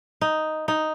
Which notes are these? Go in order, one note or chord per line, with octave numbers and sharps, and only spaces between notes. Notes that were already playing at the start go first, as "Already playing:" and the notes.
D#4
D#4